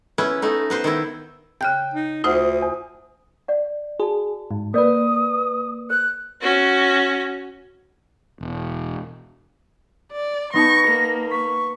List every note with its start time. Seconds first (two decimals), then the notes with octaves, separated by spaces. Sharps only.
0.18 B3 C#4 E4 B4
0.42 A3 B3 D#4
0.70 B3 B4 C5
0.84 D#3 B3 E4
1.61 C#3 G5 F#6 G6
1.94 D#4
2.24 D2 F4 C5 F#5 D#6
2.62 E2
3.48 D5 F#5
4.00 F#4 G#4 A5
4.51 G#2
4.74 A#3 A#4 B4 D5 D#6
5.90 A#4 F#6
6.41 C#4 F#4
8.41 E1
10.12 D5
10.54 B3 D#4 A5 C#6 A#6
10.88 A#3
11.31 C#6 B6